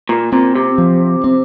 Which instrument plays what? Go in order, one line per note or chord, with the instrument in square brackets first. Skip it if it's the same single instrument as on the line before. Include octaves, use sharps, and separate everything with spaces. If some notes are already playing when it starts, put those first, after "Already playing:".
[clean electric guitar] A#2
[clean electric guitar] A#2 [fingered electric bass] C4
[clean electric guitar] C3
[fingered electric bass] F3
C4